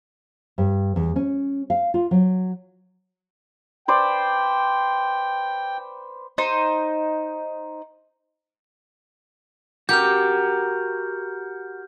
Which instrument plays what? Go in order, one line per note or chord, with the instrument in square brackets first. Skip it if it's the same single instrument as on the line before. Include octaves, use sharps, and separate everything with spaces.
[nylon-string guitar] G2
E2
C#4
F5
F4
F#3
[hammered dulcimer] B4 C5 D5 [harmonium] G5
[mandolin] D#4 C5
[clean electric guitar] F#4 A#4 [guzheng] G4 [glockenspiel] F6 G6